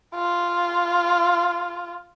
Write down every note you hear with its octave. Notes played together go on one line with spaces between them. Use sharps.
F4